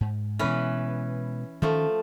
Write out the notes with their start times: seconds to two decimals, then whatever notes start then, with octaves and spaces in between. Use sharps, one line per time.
0.01 G#2
0.39 B2 E3 G#3 C#4 B4
1.62 D#3 F3 A3 C#4